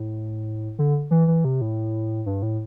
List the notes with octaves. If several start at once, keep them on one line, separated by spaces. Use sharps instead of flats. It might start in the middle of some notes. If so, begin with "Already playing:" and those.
Already playing: A2
D3
E3
E3
C3
A2
G2
A2